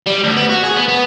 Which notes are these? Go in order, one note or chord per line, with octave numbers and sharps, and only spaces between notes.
G3
D2
B3
F#4
G#4
B3
B3